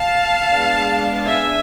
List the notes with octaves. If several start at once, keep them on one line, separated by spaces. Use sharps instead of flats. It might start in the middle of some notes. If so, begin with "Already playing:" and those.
Already playing: F5 A5
G#3 B3 D4
E5 G#5